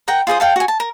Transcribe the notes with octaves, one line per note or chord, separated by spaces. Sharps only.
A#4 F#5 G5 A#5
F4 G#4 C5 D#6
A4 F5 G5
F#4 G#5
A5
A#4